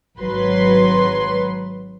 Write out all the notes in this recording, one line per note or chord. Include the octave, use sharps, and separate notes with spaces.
G#1 F#3 B4 C6